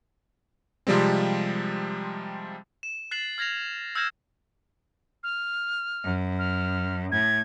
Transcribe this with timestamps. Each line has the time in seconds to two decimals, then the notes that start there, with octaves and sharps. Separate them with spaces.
0.87 C3 F3 G3 G#3 C4
2.83 E7
3.11 F#6 A6 C7 E7 F#7
3.38 F6 G#6 A#6 C7 F7
3.95 E6 F6 G6 G#6 A#6 E7
5.23 F6
6.04 F#2
6.39 F6
7.12 A2 G#6